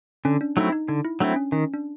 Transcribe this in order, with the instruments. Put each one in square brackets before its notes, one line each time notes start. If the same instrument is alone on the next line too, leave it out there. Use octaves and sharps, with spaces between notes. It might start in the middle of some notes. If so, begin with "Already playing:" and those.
[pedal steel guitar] D3 [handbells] C#4
[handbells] D4
[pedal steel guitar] F#3 A3 C4 E4 [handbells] D#4
[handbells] D#4
[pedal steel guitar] D3 [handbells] D#4
[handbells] E4
[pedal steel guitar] F#3 A3 C4 E4 [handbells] D4
[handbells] C#4
[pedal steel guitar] D#3 [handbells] C#4
[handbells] D4